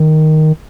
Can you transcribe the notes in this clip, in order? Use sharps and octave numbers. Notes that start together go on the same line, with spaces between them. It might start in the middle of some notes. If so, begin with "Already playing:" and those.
Already playing: D#3